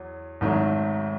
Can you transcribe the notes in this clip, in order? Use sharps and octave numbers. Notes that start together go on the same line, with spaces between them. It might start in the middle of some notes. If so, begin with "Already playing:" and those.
Already playing: E2 F#3
G#1 G#2 D#3 F#3 A3